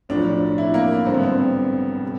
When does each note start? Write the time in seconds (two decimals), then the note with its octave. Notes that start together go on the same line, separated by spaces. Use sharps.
0.09 B1 A2 F3 D4
0.58 E4
0.74 A#3
1.06 G#1 G2 D3 C4
1.14 B3
1.23 C4
2.04 C3